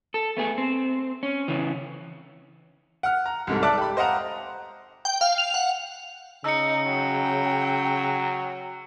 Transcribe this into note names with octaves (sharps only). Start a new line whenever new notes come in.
A4
A3 B3 G#4
C4
C#4
C#3 E3
F#5 F6
A#5
C2 G#2 A4
A4 D5 E5 A5 D6 F#6
G4 B5
C5 D#5 F5 F#5 A#5
G5
F5
F7
F#5
C#3 D#4 E6 C#7
F#3 G5